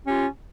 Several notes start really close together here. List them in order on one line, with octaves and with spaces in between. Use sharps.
C#4 G4 F4